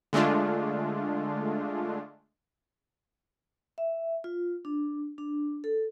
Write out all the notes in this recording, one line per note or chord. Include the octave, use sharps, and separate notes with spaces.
D3 G#3 A3 D4 F4
E5
F4
D4
D4
A4